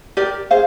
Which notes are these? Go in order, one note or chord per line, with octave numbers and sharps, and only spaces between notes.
G4 A#4 D5
G#4 C5 F5